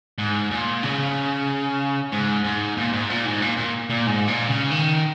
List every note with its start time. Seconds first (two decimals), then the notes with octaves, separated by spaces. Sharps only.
0.18 G#2
0.51 A#2
0.83 C#3
2.12 G#2
2.44 G#2
2.77 A#2
2.93 G#2
3.10 A#2
3.25 G#2
3.42 A#2
3.57 A#2
3.90 A#2
4.06 G#2
4.28 A#2
4.49 C#3
4.71 D#3